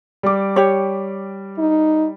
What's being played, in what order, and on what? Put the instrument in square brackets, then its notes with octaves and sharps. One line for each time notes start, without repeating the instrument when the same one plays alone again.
[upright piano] G3 D6
[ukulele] G4 C#5
[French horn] D#4